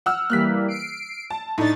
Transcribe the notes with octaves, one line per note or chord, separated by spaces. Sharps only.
F#5 E6 F6
E3 G3 A#3 F6 F#6 B6
C7 D7
A5
A2 D4 D#4 A6